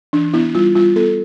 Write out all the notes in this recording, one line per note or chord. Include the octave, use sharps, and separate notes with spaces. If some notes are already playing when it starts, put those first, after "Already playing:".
E3 D4
B3 E4
G3 F4
G3 F4
B3 A4